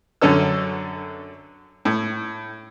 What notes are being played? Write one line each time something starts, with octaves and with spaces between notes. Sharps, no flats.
F#2 D3 C#4 A4 E6
A2